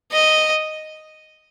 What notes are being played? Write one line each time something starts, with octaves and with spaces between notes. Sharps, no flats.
D#5